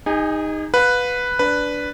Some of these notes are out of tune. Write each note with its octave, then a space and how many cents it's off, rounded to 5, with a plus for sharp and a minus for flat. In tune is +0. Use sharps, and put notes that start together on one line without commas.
D#4 +0 G#4 -40 G#5 +0
B4 +0 F5 +40
D4 -10 B4 +0